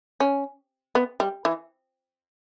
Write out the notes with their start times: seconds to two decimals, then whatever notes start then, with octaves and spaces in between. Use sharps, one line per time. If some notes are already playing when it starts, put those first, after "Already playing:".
0.20 C#4
0.95 B3
1.20 G3
1.45 E3